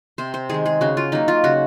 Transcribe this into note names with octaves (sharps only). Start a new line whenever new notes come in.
C3 C5
C5
D#3 G#3 G#4
G#4
C#3 F#4
F4
F#3 A#3 D#4
F4
C#3 F#4